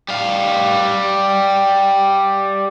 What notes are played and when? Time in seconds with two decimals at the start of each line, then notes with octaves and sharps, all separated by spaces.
0.09 G3 F5